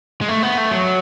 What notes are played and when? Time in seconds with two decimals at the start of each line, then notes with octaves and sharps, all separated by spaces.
0.21 G#3
0.29 A3
0.43 B3
0.58 A3
0.71 F#3